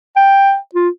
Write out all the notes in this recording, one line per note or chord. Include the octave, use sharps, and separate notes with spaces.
G5
F4